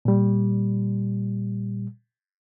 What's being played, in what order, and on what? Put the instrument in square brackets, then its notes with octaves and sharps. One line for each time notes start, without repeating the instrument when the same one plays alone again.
[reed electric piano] A#2 G3